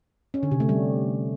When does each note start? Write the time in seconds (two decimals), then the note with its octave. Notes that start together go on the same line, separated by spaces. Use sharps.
0.34 C#4
0.43 D3
0.51 C3
0.60 A3
0.69 G3